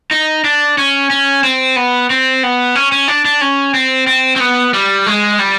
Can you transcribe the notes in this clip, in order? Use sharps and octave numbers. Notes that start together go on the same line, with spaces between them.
D#4
D4
C#4
C#4
C4
B3
C4
B3
C#4
C#4
D4
D4
C#4
C4
C4
C4
B3
G3
G#3
G3